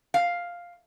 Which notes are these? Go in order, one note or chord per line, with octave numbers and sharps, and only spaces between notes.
F5